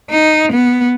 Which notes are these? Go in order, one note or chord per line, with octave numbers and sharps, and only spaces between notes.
D#4
B3